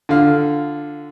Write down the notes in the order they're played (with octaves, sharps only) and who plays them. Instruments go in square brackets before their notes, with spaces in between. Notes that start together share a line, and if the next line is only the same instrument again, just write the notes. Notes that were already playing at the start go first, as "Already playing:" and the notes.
[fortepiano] D3 F4 F5